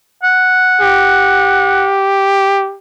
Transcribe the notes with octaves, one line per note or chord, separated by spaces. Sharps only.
F#5
G4